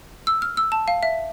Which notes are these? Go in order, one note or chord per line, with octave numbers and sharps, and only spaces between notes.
E6
F6
E6
A5
F5
E5